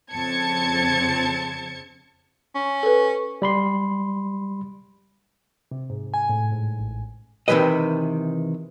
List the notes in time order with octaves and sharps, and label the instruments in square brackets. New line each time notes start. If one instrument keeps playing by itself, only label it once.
[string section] F2 C#3 C4 A5 G#6 C#7
[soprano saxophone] C#4
[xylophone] A4 B4
[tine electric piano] G3 B5 C6
[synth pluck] C3
G#2
G#5
A2
G#2
A1
[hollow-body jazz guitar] C3 D#3 E3 G#3 B4 D#5